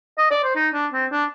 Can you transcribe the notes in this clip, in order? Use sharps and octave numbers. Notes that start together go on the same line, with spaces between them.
D#5
D5
C5
D#4
D4
C4
D4